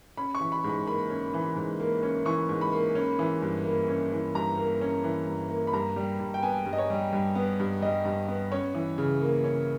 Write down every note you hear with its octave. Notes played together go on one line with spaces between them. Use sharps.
C#4 B5
C#6
E3
B5
G#2
B5
A#3 B5
C#4
E3
G#2
A#3
C#4
E3 C#6
G#2
B5
A#3
C#4
E3
G2
A#3
C#4
E3
G2 A#5
A#3
C#4
E3
G2
A#3
B5
G2 A#5
G3
G2
G5
B3 G#5
G2
D#5
C#5
G3
G2
B3
G2
G3 D#5
G2
B3
C#4 C#5
E3
C#3
A#3
C#4